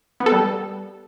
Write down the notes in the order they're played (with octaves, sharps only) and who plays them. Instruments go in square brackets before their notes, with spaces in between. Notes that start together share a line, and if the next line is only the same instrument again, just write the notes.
[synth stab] B3
A4
G3